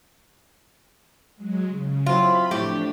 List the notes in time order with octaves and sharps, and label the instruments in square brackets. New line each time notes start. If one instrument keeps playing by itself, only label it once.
[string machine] F#3 G#3
C#3
[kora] F#3 C4 E4 [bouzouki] F4 [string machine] B5
[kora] A2 A3 [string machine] F3 D4 [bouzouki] G4